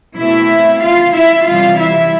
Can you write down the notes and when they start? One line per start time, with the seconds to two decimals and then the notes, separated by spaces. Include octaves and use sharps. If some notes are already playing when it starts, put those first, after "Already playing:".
0.17 B2 A3 C4 E4 E5
0.82 F4 F5
1.14 E4 E5
1.47 C3 E3 G3 F4 F5
1.79 E4 E5